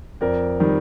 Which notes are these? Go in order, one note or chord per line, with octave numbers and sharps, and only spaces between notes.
F2 A#4 D5
D#3 G3